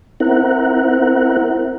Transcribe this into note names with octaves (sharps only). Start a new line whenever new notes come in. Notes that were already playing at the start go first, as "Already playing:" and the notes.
C4 E4 A#4 F#5